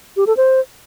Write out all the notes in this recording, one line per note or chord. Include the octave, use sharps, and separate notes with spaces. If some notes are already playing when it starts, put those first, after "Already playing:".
G4
A4
C5